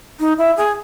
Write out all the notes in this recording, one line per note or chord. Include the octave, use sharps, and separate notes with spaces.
D#4
E4
G#4